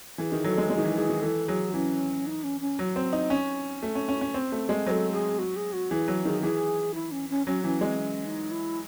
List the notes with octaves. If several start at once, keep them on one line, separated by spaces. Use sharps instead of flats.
E3 G#4 A4
D#3
F#3 A4
G#3
G#3 A4
D#3 G#4
E3
E3 G#4
D#3
E3 A4
F#3 G#4
E3 C#4
D#4
C#4
C#4
F#3
C4
D#4
C#4
A3
C#4
C#4
C#4
C4
A3
G#3
F#3 A4 C5
G#4
F#4
G#4
F#4
E3 G#4
F#3
D#3 G#4
E3 G#4
E4
C#4
C#4
F#3 C#4
E3 C#4
G#3 C4
C#4
D#4
E4